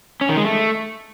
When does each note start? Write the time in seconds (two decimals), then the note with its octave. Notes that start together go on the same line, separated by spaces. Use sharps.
0.21 C#4
0.29 D#3
0.37 G#3
0.45 A3